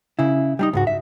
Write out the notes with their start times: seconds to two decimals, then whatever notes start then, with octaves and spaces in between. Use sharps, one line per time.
0.19 C#3 E4
0.59 G3 D4 D#4
0.73 C#2 G#2 F#4
0.87 E5